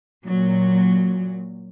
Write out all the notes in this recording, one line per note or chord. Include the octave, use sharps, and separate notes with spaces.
A#2 F#3